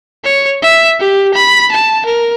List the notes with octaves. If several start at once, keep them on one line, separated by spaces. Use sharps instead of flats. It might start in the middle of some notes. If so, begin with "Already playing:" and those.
C#5
E5
G4
B5
A5
A#4